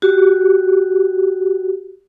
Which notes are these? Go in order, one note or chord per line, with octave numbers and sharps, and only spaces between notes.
F#4 G4